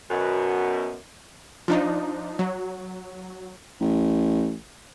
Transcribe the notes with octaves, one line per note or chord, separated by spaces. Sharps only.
F#2 B2
F3 D4 D#4
F#3
A1